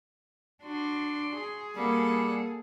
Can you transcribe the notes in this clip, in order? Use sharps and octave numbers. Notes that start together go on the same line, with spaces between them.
D4 F#4 C6
G#4
G3 A#3 A4 F#5